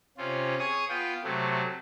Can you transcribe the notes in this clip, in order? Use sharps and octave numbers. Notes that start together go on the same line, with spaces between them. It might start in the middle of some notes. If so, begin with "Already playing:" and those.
C3 C4 C#4 F4
G#4 C#5 C#6 D#6
B3 F4 G5
C3 F#3 A3